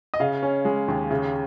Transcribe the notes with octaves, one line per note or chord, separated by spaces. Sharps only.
D#5
C#3 F5
C#4
G#3
D#2
C#3